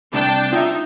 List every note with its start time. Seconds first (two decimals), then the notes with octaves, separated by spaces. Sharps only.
0.13 C2 D4 G5 A5
0.53 D#4 F4 E5